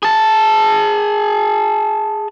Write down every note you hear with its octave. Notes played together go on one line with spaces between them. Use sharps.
G#4 A5